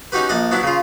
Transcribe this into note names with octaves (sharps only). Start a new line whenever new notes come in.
C#4 D#4 F#4 G4 B4
A#1 D5 D#5
F#3 B3 D4 E4
C#3 F4